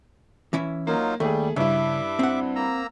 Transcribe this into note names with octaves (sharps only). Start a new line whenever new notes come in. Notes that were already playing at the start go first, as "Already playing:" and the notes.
E3 C#4 E4
F#3 A#3 D#4 F4
D#2 G3 A3 G#4
G2 C#3 E4 E5 D6
C4 F#5
A#3 A#5 E6